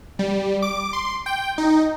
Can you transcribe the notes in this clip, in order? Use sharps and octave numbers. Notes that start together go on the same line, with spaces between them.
G3
D6
C6
G5
D#4